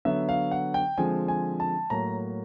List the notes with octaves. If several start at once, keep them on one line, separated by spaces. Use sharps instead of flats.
D3 F#3 B3 E5
F5
F#5
G5
D3 F3 G#3 C4 G#5
G#5
A5
A2 F#3 A#3 A#5